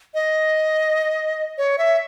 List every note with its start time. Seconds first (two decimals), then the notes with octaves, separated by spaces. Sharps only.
0.14 D#5
1.58 C#5
1.78 E5